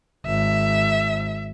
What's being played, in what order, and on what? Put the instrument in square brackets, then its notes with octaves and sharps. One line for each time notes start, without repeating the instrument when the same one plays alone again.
[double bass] G#1 [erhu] E5